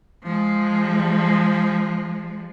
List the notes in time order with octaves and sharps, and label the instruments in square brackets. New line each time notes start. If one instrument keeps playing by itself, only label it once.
[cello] F3 G#3